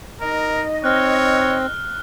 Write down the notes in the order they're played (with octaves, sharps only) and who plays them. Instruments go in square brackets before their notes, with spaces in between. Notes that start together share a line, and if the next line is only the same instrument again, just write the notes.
[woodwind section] D#4 D#5 [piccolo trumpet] A#4
[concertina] C4 [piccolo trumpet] C#5 [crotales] F6 F#6
[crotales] F6